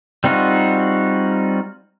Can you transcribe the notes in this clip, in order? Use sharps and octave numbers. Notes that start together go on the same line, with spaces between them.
G3 C4 D#4 F4 F#4